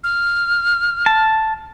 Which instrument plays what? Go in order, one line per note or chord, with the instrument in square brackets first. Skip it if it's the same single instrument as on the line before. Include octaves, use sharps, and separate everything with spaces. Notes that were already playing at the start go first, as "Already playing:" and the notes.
[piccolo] F6
[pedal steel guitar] A5